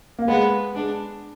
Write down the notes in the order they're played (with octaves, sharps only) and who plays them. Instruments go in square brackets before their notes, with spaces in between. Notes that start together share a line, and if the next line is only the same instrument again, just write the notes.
[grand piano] A#3
[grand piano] G#3 [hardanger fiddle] B3
[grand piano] G#3 [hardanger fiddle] D4